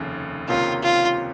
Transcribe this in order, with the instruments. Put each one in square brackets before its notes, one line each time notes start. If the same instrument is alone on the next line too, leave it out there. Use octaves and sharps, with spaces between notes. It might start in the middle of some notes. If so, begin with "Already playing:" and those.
Already playing: [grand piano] F1 D#2 C#3
[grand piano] C#2 C3 D#3 A#3 C#4 [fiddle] F4
[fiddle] F4